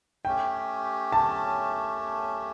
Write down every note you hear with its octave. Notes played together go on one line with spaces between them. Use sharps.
A3 C#4 G4 G5
A5